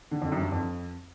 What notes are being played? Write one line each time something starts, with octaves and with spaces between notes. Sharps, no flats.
D3
F2
F#2
G2
F2